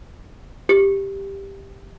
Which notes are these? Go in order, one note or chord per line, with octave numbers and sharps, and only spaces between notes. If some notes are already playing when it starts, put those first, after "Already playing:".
G4